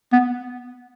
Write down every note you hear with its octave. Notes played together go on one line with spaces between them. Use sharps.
B3